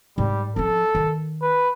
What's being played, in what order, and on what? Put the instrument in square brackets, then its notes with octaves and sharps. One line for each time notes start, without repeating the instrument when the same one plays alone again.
[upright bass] G#2 [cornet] G3
[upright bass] F3 C#4 [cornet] A4
[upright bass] D#3
[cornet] B4